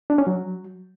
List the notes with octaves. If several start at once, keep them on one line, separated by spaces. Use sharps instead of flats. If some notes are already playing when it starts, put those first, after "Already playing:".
D4
C#4
F#3